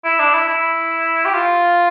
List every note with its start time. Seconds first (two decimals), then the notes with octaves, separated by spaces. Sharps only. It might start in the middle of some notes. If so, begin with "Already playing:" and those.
0.05 E4
0.19 D4
0.34 E4
0.48 E4
1.25 G4
1.34 F4